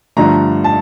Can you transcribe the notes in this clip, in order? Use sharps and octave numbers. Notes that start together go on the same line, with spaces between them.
G2 D3 F3 A3 A#5
A5